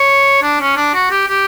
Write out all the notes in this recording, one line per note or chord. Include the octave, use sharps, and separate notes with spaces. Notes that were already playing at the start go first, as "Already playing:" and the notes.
Already playing: C#5
D4
C#4
D4
F#4
G4
G4